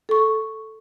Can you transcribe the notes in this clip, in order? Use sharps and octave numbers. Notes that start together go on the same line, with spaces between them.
A4 C#6